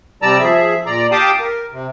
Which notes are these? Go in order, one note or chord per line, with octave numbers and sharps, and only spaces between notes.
C3 G3 D5 A5 A#5 E6
F3 G#4 E5
A#2 D5 A#5
G4 F5 G5 A5 D6 D#6
A#4
C3